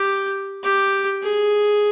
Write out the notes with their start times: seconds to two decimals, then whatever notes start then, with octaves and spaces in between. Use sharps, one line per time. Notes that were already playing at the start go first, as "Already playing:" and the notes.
Already playing: G4
0.64 G4
1.23 G#4